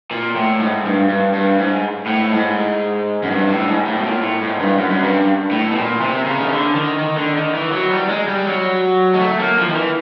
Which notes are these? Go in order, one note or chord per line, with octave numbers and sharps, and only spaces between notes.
A#2
A2
G#2
G2
G2
G2
G#2
A2
G#2
F#2
G2
A2
G#2
A2
B2
A#2
A2
G#2
G2
F#2
F#2
G2
A2
B2
A#2
C3
C#3
D#3
D3
D#3
D#3
D3
D#3
E3
F#3
G3
G#3
G3
F#3
G#3
A3
A#3
F3
D#3
E3